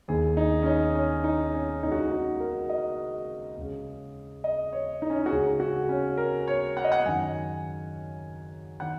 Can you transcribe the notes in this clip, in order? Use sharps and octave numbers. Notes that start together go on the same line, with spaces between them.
D#2 D#3 G#4
D#4
C#4
D#4
C#4
D#4
C#4
C#2 C#3 D#4
F#4
D#4
F#4
A#4
D#5
C#2 C#3
D#5
C#5
D#4
C#4
D#4
F#4
C#2 C#3 G#4
F#4
C#4
A#4
C#5
F#5
D#5
F#5
F#2 D#3 G#5
D#3 F#5